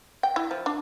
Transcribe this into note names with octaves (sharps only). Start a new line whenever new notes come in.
G5
E4
F3
D4